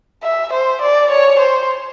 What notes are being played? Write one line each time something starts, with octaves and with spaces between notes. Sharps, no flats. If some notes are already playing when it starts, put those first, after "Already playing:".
E5
C5
D5
C#5
C5